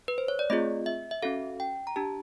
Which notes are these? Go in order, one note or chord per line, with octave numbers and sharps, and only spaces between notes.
B4
C5
C#5
D5
A3 C4 F4 G#4 D#5
E5
E5
C#4 F#4 A4 F5
G5
A#5
D4 G4 A5